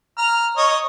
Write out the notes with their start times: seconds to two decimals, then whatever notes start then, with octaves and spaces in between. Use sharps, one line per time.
0.18 A#5 F6
0.57 C#5 D#5 D#6